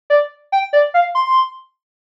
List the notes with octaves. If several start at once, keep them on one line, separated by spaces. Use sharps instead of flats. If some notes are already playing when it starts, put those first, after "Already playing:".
D5
G5
D5
F5
C6